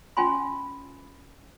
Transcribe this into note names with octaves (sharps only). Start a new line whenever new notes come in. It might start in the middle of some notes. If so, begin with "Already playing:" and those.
C#4 F4 G#5 B5 C6